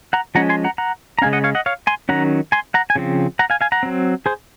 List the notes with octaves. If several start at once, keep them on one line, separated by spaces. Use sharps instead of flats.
F#5 A#5
F3 G#3 C#4 F#5 A#5
G#5 C6
F#5 A#5
F#5 A#5
A#5
C#3 G#3 C#4 F5 G#5
D#5 F#5
C#5 F5
D#5 F#5
C#5 F5
G#5 C6
D#3 F#3 C#4 F#5 A#5
G#5 C6
F#5 A#5
G#5
C#3 F3 C4
F#5 A#5
F5 G#5
F5 G#5
F#5 A#5
F#3 C4
G#4 C5